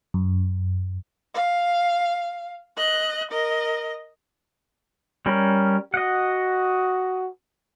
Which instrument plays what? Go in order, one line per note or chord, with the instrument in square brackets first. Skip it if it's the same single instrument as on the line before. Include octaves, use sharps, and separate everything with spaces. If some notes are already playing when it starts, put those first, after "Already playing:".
[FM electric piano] F#2
[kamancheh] F5
D#5 F#6
A#4 D#5
[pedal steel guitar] G3 C#4 A#4
[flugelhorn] F#4 [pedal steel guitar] D#5 F#5